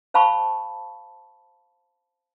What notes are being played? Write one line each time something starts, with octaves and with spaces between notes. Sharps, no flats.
C5 F5 A5 B5 C#6